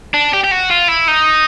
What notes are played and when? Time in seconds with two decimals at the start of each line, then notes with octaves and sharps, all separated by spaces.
0.14 D4
0.33 G4
0.44 G4
0.51 F#4
0.70 F4
0.88 E4
1.08 D#4